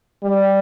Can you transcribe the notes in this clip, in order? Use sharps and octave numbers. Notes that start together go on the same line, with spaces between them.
G3